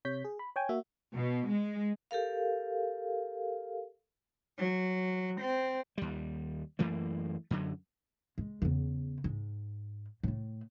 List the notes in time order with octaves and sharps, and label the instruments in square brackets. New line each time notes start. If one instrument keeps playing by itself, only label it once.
[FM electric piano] C3 C#5 G6 B6
G#4
B5
C#5 G5 G#5
A#3 F#4 E5
[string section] B2
G#3
[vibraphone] G4 A4 A#4 F5
[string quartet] F#3
C4
[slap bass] D#2 G3
F#2 E3 A3 A#3
F#2 D3 F#3
[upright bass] G#3
E2 C#3
G#2
A2 A3